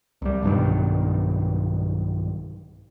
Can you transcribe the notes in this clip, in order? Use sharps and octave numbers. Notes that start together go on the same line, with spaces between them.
C2 G3
B1 G2 B2 D#3